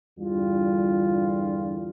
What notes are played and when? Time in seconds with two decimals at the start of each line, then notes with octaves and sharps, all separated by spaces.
0.19 E2 G2 D3 G3 F4